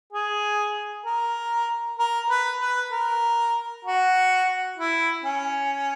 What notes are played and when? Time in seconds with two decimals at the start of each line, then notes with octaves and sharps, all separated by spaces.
0.13 G#4
1.06 A#4
1.99 A#4
2.30 B4
2.61 B4
2.92 A#4
3.85 F#4
4.78 E4
5.24 C#4